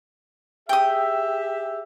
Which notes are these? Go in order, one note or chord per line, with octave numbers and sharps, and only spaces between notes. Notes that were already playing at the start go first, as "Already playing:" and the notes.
G4 G#4 E5 G5 D#6